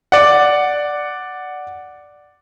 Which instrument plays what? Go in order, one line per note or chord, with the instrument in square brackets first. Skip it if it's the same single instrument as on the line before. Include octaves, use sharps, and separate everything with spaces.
[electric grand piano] D5 F#5